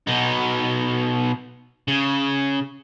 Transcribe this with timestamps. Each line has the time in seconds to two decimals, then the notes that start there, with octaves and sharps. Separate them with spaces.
0.07 B2 D#4
1.88 C#3